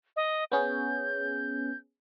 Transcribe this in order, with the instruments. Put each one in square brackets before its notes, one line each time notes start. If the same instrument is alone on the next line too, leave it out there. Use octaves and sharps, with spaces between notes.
[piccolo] D#5
[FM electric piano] B3 C#4 G#4 [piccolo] G6